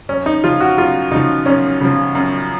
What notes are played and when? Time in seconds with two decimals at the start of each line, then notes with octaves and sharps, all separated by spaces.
0.09 F#2 C#4
0.26 D#4
0.44 C#3 F3 F4
0.61 F#4
0.77 F#2 F4
1.11 C#3 F3 D#4
1.46 F#2 C#4
1.81 C#3 F3
2.15 F#2